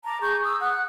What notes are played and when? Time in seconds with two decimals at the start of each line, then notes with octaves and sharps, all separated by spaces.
0.05 A5 A#5 D6
0.21 G#4 C#6 G6
0.44 D#6 E6
0.59 F#5 F#6